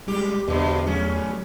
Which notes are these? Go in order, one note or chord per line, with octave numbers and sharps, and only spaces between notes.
G3 G#3 G4
E2 G2 B2 D3 C5
F#3 A3 C#4